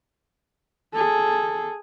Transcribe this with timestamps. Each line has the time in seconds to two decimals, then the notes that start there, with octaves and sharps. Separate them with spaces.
0.94 G#4 A4